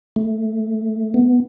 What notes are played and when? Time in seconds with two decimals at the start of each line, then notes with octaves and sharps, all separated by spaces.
0.16 A3
1.14 B3